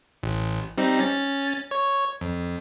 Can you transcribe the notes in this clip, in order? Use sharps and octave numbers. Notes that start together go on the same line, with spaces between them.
A1
G3 C4 D#4
C#4 A6
C#5
F2